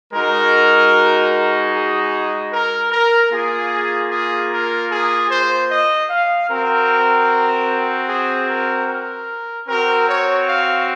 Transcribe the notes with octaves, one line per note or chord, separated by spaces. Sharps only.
G#3 D#4 F#4 A#4
G#4
A#4
A#4
A#3 F4 G#4
G#4
A#4
G#4
C5
D#5
F5
C4 F#4 A#4
G#4
A#4
A#4
C4 F#4 A#4
C#5
F5